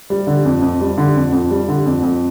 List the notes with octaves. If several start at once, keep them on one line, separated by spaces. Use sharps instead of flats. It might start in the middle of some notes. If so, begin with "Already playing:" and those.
G3
D3
F2
F2
G3
D3
F2
F2
G3
D3
F2
F2